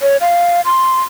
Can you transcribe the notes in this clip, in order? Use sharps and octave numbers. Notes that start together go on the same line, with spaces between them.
C#5
F5
C6